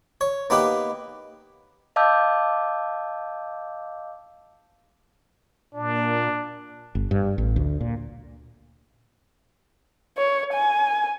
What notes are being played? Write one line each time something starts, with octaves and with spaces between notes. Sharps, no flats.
C#5
A#3 B3 D#4 G4 B4
D#5 F5 A5 D6 E6 G6
A#2 D4
G1
G2
A1
D2
A#2
C#5
G#5